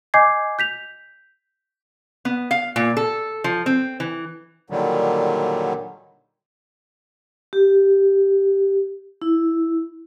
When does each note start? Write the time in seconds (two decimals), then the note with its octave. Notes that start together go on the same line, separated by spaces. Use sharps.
0.14 D#5 G#5 D6 G6 G#6 C7
0.59 G6 B6 F7
2.25 B3
2.51 F5
2.76 A#2
2.97 A4
3.44 F3
3.66 C4
4.00 E3
4.70 A#2 D3 D#3 F#3 G3
7.53 G4
9.22 E4